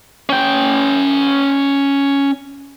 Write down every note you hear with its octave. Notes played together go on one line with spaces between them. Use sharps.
C#4 G5